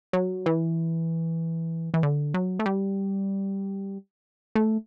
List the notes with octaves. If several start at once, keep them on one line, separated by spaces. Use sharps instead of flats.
F#3
E3
E3
D3
F#3
A3
G3
A3